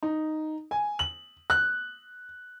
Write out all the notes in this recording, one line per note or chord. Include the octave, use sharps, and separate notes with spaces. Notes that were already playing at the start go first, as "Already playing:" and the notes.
D#4
G#5
F#7
F#6